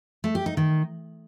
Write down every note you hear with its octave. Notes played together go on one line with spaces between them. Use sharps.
A3
G4
D#4
D#3